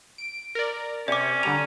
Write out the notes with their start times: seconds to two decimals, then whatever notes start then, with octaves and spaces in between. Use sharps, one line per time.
0.18 D7
0.55 A#4 D5
1.08 C3 C#4 D5 D6
1.43 D3 G3 A#5 D#7 F7